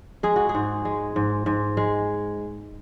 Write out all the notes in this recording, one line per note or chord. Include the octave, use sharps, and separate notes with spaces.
G#3 G#4
F#4
G#4
G#2
G#3
G#2
G#2
G#3